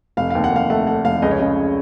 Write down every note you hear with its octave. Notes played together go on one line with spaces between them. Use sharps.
F1 F5
D#2 F5
F#5
F1 F5
A3 F#5
A3 F#5
F1 F5
C#2 D#5
C#5
C#3 D#5